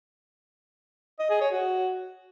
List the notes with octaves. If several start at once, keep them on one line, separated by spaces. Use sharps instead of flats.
D#5
G#4
C#5
F#4